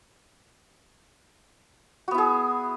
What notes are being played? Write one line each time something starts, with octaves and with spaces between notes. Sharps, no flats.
B3 E4 F#4 G#4